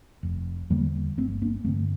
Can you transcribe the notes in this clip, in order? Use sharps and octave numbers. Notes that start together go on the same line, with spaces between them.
F1
E2 D3 G3 A#3
G1 A3 C4
A#3 D4
G2 D3 A3 C4